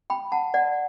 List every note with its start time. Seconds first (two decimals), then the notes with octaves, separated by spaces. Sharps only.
0.10 G5 B5
0.32 F#5 A5
0.54 D5 F#5